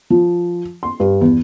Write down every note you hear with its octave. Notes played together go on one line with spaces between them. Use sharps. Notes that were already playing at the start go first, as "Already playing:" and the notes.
F3
C6
G2
E2